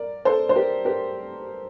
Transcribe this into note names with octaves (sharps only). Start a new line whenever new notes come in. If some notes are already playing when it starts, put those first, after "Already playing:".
Already playing: A#4 D5
A4 C5
C5
G4 A#4
G4 A#4